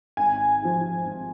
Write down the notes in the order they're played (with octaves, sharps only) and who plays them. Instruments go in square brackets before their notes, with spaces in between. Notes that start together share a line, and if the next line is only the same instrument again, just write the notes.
[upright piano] G#1 G#5
G#2 F3
G#1